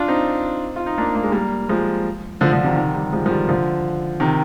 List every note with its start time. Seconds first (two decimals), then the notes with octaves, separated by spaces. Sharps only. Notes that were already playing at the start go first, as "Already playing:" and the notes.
Already playing: D4 F4
0.08 C4 D#4
0.76 F4
0.86 D#4
0.98 A#3 D4
1.15 A#3
1.23 G#3
1.32 G3 A#3
1.69 F3 G#3
2.41 D3 F3
2.52 D3 F3
2.64 C3 D#3
2.76 C3 D#3
2.95 D#3 G3
3.12 F3 G#3
3.26 F3
3.30 D#3 G3
3.49 D3 F3
4.20 C3 D#3